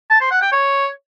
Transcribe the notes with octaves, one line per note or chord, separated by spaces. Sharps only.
A5
C5
F#5
G5
C#5